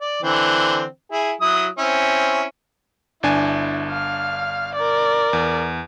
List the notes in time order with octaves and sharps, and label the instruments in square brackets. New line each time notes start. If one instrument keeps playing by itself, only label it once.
[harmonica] D5
D3 E3 C4
E4 G#4
F#3 E4 D#6
C4 C#4 E4
[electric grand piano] G1 D4 G#5 [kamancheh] E4
[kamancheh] F5 F6
A#4 D5
[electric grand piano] E2